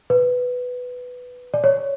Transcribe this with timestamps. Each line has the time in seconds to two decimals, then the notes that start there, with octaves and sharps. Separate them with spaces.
0.10 B4
1.54 D5
1.64 C#5